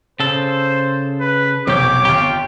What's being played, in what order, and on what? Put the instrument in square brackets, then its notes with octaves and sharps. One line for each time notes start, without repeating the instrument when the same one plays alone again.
[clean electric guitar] C#3 A4 [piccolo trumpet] C5
[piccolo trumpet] B4
[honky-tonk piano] F1 C4 C#5 [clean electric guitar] B1 G4 [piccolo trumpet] D6
[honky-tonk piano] G1 G5 C#6 [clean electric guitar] F4 G4